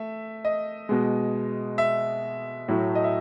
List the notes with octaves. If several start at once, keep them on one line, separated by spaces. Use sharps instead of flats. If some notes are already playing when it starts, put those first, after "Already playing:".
Already playing: A3 E5
D#5
B2 G#3
E5
A2 F#3 A3
D#5
E5